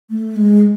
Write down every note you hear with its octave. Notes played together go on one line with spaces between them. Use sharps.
A3
G#3